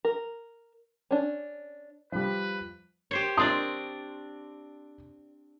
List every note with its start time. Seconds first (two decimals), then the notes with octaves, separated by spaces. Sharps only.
0.05 A#4
1.11 C#4 D4
2.12 F3 G3 B4
3.11 G4 C5 C#5
3.37 C4 D4 D5 C6 D#6